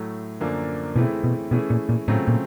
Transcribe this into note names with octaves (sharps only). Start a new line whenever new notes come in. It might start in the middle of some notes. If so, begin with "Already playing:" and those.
Already playing: A2 F#3 A3
F#2 D3 F3 A#3 D4
B2 E3 A3 C4 E4 G#4
B2
B2 E3 A3 C#4 E4 G#4
A#2
A#2
A2 C#3 F#3 A3 C4 F4
A#2